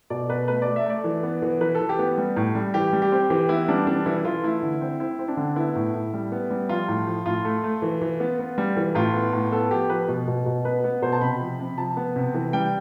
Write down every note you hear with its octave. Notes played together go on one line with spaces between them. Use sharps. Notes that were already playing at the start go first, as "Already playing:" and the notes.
B2 D5
B2 B4
A3 B4
A3 D5
E5
A3 D5
E3
B3
E3
E3 B4
A4
E3
G4
B3
G3
A2
G3
E3 G4
G3
G4
C4
E3 G4
B3 E4
G3 D4
E3 D4
E3 E4
E3 F4
A3 E4
D3
C4
C4 E4
C4
D4
D3
B3 E4
A2
A2
G3
B3
G3
F3 F4
A2
F3
A2 F4
A3
A3
E3
E3
B3
B3
G3
E3
A2 F4
B3
A2
B3 A4
F3 G4
F3 B4
B2
B2
B2
B3 B4
B3
B2 C5
A5
C3 B5
F3
C3
F3 A5
B3
C3
E3
G3 G5